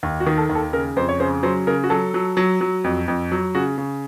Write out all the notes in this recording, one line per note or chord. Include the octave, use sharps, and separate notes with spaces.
D#2
F#4
D#3
A4
D#2
A4
C#3 A#4
F2 C5
C#5
C#3 C5
F#3 C5
C#3 A#4
F#4
F#3 A4
F#3
F#3
F#3
F2
F2
F#3
C#3 F#4
C#3